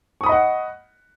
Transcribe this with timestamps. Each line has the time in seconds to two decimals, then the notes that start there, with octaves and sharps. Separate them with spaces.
0.21 C#6
0.23 D#6
0.26 B5
0.29 D#5
0.32 F#5